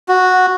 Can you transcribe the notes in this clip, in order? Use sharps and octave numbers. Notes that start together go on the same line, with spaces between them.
F#4